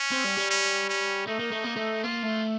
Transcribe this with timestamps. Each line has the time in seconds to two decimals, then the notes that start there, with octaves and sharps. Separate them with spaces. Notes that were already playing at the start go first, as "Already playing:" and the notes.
Already playing: C#4
0.12 C4
0.24 G3
0.37 G3
0.50 C#4
0.89 C#4
1.27 A3 D#4
1.39 A#3
1.51 A3
1.64 A#3
1.76 A3
2.04 A#3 F4
2.23 A3